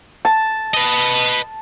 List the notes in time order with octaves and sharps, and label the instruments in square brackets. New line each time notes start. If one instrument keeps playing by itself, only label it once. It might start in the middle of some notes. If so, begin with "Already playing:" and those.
[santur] A5
[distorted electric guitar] B4 D#5